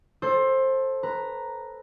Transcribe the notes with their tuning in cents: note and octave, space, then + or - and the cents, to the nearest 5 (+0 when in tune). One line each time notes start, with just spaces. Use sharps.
A4 +0 C5 +20
B4 +0 A#5 +0